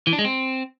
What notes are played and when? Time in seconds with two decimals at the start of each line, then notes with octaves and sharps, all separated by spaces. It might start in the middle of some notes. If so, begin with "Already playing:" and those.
0.07 E3
0.13 D4
0.19 G#3
0.24 C4